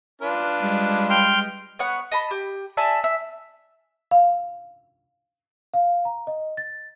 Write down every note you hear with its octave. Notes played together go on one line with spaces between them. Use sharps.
D4 F4 B4
G3 G#3
G5 C6 F6
B3 C#5 F#5
D#5 A5 B5
G4
D5 E5 G#5 A5
E5
F5
F5
A#5
D#5
A6